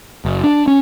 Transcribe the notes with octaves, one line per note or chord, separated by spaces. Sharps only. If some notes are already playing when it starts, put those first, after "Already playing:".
F#1
D4
C#4